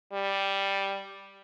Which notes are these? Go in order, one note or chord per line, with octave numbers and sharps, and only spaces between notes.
G3